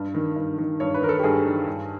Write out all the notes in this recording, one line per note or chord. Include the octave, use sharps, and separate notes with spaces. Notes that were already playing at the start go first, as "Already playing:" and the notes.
Already playing: G2
D#3
G2
D#3
G2 C#5
B4
D#3 A#4
A4
G4
G2 G#4
D#3
G2